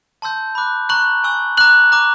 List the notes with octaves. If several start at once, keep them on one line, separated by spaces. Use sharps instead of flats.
A5 C6 E6 G6
B5 D6 F#6
A#5 C#6 F#6 F#7
G#5 C#6 E6
A#5 D6 F#6 F#7
A#5 D6 F#6